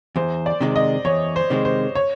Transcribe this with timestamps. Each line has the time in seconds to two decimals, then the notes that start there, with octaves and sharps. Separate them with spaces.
0.16 E2 C5
0.46 D5
0.61 C3 D#3 G#3
0.76 D#5
1.05 E2 C#5
1.36 C5
1.50 C3 D#3 G#3
1.65 C5
1.95 C#5